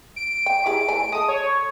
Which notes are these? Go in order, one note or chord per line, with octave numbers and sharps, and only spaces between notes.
D7
G5
E4 G4 G#4 D7
E3 A3 G#5
G#3 A4 D#6
C#5